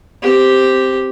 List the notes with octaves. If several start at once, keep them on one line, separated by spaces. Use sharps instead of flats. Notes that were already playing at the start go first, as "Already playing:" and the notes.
C4 G4